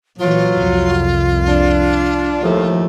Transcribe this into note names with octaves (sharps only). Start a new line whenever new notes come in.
A#2 E3 F#3 F4
C2 F2
D4
D#2 A2 F3 A3